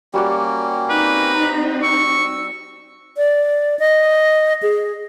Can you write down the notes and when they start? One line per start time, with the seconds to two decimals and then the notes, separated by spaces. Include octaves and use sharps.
0.14 G3 A#3 C#4 F#4 D5
0.90 C4 D#4 B4
1.35 A#5
1.83 C#6 E6
3.17 D5
3.79 D#5
4.63 G#4